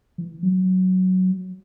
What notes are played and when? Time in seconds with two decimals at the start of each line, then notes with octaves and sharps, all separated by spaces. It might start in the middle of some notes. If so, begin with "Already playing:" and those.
0.18 E3
0.43 F#3